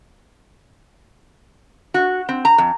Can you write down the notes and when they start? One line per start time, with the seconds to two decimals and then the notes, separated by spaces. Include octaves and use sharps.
1.94 F#4
2.29 C4
2.45 A#5
2.58 F2